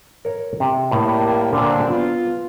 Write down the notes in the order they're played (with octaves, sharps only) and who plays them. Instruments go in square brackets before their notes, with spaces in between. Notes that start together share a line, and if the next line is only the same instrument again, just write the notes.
[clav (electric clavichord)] A#4 C#5
C3
[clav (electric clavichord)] A2 [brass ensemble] G3 A#3
[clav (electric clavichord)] A#2 D3 A#4 [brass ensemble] A#3 C4 D4
[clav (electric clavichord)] B3 [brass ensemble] F4